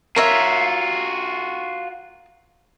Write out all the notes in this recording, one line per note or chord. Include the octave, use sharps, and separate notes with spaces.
F4 F#4 A#4 C#5 E5